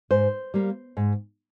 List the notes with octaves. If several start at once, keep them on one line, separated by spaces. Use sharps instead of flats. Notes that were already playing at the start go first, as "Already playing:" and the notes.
G#2 C5
G3 A#3
G#2